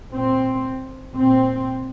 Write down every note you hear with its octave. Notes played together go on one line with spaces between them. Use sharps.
A#2 C4
A#2 C4